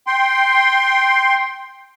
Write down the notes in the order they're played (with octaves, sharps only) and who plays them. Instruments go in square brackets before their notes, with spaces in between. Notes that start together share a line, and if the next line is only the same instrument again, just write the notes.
[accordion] G5 C6